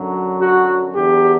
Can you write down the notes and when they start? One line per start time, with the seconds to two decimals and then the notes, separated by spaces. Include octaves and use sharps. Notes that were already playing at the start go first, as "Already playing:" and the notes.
Already playing: F#2 D3 F#3
0.39 F#4
0.95 E2 D3 F#3 G4